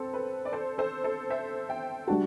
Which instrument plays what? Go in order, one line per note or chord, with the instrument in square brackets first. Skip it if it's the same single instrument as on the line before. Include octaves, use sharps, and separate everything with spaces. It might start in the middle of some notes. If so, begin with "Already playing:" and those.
Already playing: [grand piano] C4 [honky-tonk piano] A4
[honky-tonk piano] B4
D5
A4 C5
A4 C5
A4 C5
C5 E5
E5 G5
[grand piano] G3 D4 F#4 [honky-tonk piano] F#5 A5